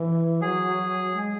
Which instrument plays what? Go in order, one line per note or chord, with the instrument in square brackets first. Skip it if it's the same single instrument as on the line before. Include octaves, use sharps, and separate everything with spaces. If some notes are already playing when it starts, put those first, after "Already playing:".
Already playing: [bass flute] E3
[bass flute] F#3 [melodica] G#4
[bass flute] G#3